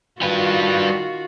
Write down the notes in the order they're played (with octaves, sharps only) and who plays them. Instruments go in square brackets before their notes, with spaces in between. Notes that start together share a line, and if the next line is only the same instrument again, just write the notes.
[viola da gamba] D#3 F4 F#4 [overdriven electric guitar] G3 B4